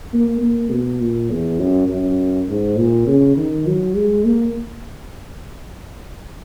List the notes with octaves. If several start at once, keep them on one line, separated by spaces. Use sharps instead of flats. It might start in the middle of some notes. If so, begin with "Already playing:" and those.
A#3
A#3
B2
A#2
E2
F#2
F#2
G#2
A#2
C#3
D#3
F#3
G#3
A#3